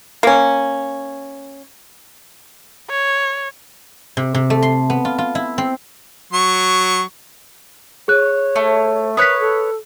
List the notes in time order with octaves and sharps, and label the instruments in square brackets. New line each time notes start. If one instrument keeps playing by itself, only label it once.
[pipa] A#3 C#4
[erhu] C#5
[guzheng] C3
C3
A3
C6
B3
F4
F4
E4
C4
[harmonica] F#3 C#6
[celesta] G#4 F#6 [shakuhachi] C#5
[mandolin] A3
[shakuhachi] A#4 [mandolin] B4 C#5 [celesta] D#6 F#6 B6
[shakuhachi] A4